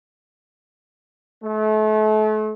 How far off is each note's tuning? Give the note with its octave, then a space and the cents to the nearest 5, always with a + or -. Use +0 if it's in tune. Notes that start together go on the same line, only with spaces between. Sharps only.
A3 -35